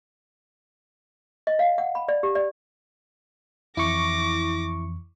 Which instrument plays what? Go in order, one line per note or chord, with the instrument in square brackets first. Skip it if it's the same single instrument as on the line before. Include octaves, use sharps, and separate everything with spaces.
[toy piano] D#5
F5
F#5
B5
D5
G4
D5
[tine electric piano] F2 E3 [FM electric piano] E4 C#6 [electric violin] D6 A#6